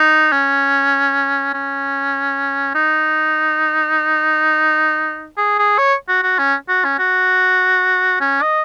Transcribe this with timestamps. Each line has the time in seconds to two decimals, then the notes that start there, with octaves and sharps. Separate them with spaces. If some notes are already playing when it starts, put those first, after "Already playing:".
Already playing: D#4
0.32 C#4
1.54 C#4
2.75 D#4
5.37 G#4
5.59 G#4
5.78 C#5
6.09 F#4
6.23 F#4
6.39 C#4
6.69 F#4
6.85 C#4
6.99 F#4
8.20 C#4
8.42 D#5